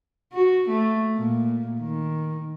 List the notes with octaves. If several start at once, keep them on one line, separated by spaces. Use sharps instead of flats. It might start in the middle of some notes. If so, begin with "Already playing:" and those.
F#4
A3
A#2
D#3